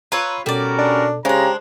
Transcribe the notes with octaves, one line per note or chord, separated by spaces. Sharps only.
F4 B4 C#5 A#5 B5 E6
B2 G3 C#4 F#4 A4 A#4 D5
D4
C#3 G#3 D4 G4 C5 A#5